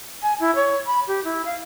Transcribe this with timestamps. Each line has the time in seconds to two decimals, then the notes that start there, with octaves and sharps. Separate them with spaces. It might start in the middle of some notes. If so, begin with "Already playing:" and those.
0.23 G#5
0.40 E4
0.55 C#5
0.87 B5
1.07 G4
1.24 E4
1.45 F5